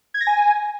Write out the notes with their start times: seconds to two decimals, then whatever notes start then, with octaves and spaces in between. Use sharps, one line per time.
0.14 G#6
0.21 A#6
0.27 G#5